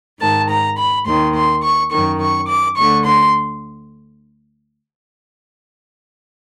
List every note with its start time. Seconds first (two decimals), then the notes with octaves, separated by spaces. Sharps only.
0.20 G#2 D#3 A5
0.50 A#5
0.78 B5
1.07 D#2 D#3 C6
1.35 C6
1.63 C#6
1.91 F#2 D#3 C#6
2.21 C#6
2.48 D6
2.77 D2 D3 C#6
3.05 C6